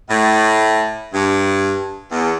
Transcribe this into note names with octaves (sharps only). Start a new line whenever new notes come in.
A2
G2
E2